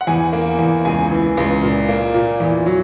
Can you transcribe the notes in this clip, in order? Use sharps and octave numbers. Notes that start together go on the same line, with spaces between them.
F#5
E2 G#5
A#3
E2
C#2 G#5
E3
C#2
A#2
A#3
A#2
E2
F#3